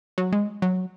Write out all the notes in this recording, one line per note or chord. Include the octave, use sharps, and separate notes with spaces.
F#3
G#3
F#3